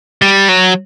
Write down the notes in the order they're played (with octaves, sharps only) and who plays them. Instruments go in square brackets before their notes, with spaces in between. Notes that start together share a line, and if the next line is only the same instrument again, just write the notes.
[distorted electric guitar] G3
F#3